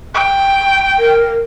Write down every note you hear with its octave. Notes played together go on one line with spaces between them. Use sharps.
G5
A#4